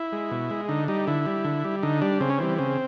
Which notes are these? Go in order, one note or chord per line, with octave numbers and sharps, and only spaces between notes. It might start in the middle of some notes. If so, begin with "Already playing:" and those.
Already playing: E4
G#3
B2
G#3
D3 D#4
G3 D#4
D3 E4
G3
D3
G3
D3 D#4
G3 D4
C#3 C4
C#4
E3 G3 C4
C#3 C4